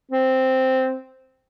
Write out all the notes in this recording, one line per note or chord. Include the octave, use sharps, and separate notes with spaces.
C4